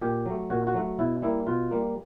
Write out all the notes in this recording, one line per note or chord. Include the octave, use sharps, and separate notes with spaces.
A#2 G4
F#3 A3
A#2 F#4
F#4
F#3 A3
B2 E4
G3 A#3 E4
B2 F4
G3 A#3